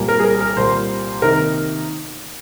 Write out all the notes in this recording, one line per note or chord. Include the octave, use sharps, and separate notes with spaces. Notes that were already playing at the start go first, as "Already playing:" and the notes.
Already playing: C2 A#2 G3 A#3
A#4
G#4
A#4
A#4
C2 A#2 G3 A#3 C5
C3 D#3 A#3 D#4 A#4